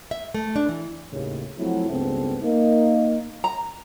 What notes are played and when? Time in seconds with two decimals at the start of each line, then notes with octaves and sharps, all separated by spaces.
0.11 E5
0.34 A3
0.56 D4
0.69 E3
1.12 D#2 A2 C#3
1.57 F3 F#3 A3 C4 E4 F#4
1.89 C#2 G2 C#3 B3 C4 A4
2.41 A#3 D#4
3.44 A#5